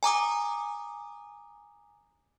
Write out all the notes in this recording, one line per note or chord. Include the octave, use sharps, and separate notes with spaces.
G#5 A#5 D6 D#6